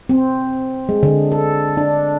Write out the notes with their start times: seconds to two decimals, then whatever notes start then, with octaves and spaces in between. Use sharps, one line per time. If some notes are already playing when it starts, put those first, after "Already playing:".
0.09 C4
0.89 G#3
1.03 D3
1.32 A4
1.77 D4